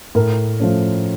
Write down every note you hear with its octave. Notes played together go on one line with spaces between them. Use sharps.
A2 A#4
F3 A3 C#4